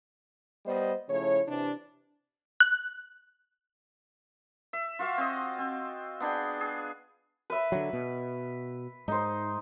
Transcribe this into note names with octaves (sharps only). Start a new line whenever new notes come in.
G3 B3 C5 D#5
C#3 F3 A3 E4 C#5
C3 E3 D4
F#6
E5
F4 F#4 E5 F5
C4 D#5
C4
B3 D4 G#4 G5
G#4
B4 E5
D3 F#3
B2
G#2 D#4 C5